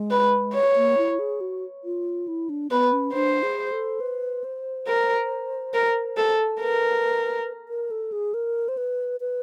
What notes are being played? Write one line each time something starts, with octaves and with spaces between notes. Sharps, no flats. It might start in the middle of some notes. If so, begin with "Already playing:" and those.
Already playing: G#3
B4
C#5
A#3
E4
G#4
F#4
F4
E4
D4
B3 B4
C#4
D4 C5
G#4
A4
B4
C5
A#4
A#4
A4
A#4 B4
A#4
A4
G#4
A#4
C5
B4
B4